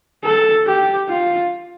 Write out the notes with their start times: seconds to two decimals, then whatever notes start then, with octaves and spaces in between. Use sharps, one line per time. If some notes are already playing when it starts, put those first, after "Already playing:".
0.24 A4
0.66 G4
1.08 F4